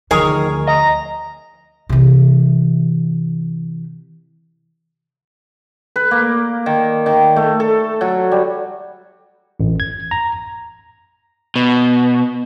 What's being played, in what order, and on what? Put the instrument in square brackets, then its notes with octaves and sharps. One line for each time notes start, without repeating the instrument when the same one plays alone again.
[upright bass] D2 F3 [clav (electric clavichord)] D#3 [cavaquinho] G#4 A#4 C#5
[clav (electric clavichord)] D#5 [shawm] A#5
[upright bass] C3 E3
[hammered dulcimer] B4
A#3
D#3
D#3
A3
A4
F#3
G3
[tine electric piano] A1
G#6
A#5
[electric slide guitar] B2